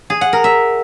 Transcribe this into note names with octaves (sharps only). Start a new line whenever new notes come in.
G#4
F#5
A#4
E5